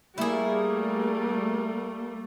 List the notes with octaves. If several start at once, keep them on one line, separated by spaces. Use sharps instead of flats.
G3 A3 A#3 E4 G#4